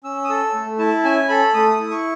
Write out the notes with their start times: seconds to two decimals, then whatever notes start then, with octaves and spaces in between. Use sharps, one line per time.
0.04 C#4 E6
0.24 D#6
0.29 A4 E6
0.54 A3
0.78 E4 A5
1.04 C#4 G#5
1.29 A4 B5
1.54 A3 D#6
1.79 E4
1.91 C#6